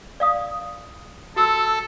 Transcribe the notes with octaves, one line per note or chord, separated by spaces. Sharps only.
D5 F5 D#6
F#4 A4 E6